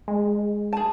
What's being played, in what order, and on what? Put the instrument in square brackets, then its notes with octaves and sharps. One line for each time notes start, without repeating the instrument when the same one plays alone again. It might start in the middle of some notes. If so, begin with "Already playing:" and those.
[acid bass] G#3
[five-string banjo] G#4 A5